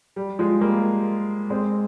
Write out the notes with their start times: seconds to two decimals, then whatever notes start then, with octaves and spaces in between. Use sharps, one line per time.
0.16 G3
0.39 F3 G#3
0.61 G3 A#3
1.50 G#3 C4